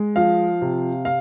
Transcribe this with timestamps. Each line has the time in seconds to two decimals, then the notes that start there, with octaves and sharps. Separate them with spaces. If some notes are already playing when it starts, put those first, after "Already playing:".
Already playing: G#3
0.16 F3 F5
0.62 C3
1.05 F5